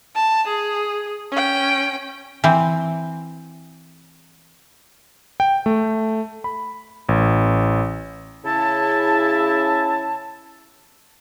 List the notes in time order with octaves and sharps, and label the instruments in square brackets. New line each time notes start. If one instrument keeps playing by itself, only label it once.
[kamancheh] A5
G#4
C#4 G5
[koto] E3 C4
[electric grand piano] G5
A3
B5
A1
[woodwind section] C#3 E4 A5